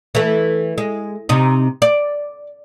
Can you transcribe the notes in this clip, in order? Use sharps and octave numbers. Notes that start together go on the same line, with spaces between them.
E3 A3
G#3
C3 D#4
D5